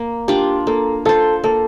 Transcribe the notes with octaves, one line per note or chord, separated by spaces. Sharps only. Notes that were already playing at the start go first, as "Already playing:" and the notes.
Already playing: A#3
D4 F4 G4
A#3 A4
F4 A4 C5
A#3 A4